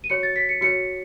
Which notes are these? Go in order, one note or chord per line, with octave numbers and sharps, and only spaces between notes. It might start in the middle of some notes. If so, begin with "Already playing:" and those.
D#7
F#4 C#5 C#7
A6
B6
C#7
F#4 C#5 C#7